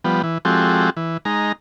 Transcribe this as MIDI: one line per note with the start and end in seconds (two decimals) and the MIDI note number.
0.04 0.22 53
0.04 0.22 55
0.04 0.22 59
0.24 0.38 52
0.45 0.90 53
0.45 0.90 56
0.45 0.90 60
0.45 0.90 66
0.45 0.90 67
0.45 0.90 69
0.97 1.17 52
1.25 1.52 56
1.25 1.52 63
1.25 1.52 82